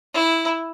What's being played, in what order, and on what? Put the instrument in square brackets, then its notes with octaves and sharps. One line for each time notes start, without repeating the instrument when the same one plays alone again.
[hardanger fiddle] E4